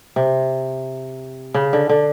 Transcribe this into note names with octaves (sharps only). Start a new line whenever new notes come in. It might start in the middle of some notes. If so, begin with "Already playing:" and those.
C3
C#3
D3
D3